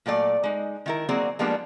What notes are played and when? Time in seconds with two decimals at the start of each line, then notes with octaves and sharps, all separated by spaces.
0.06 A#2 F#3 A3 D5 F5
0.44 G#3 D#4
0.86 D#3 E4 A#4
1.09 F#3 A#3 C4 F#4 G#4 D5
1.39 F3 G3 G#3 A#3 B3 D4